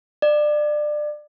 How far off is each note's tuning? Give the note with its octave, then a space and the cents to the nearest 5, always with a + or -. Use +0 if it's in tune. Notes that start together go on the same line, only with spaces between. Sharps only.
D5 +25